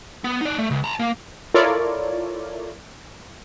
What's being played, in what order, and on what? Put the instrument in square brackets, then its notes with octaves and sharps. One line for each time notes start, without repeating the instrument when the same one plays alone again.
[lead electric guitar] B3
D#4 D5
A3
C#2
A5 A#5
A#3
[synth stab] E4 F4 A4 A#4 C#5 D5